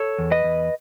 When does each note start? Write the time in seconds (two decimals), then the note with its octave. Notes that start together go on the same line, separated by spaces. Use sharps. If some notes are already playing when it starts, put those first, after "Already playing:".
Already playing: A4 C#5
0.19 E2
0.31 B4 D#5
0.44 E2